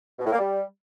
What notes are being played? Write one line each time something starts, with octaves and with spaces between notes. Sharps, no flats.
B2
A2
A#3
G3